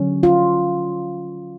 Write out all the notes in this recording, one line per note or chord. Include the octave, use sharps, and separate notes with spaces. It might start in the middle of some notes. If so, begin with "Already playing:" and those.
Already playing: D3 F#3 C#4
F4